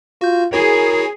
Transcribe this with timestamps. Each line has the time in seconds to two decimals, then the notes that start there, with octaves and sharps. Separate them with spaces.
0.21 F4 F#4 G6
0.53 E4 F#4 G#4 A#4 C#5